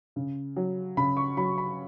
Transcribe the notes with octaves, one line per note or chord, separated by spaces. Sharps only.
C#3
F#3
C#3 B5
C#6
F#3 B5
B5